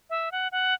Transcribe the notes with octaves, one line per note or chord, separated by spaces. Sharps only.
E5
F#5
F#5